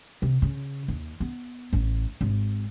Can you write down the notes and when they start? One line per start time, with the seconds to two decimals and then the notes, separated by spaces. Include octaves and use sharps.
0.22 C3
0.42 C#3
0.88 D#2
1.20 B3
1.73 A1
2.21 G#1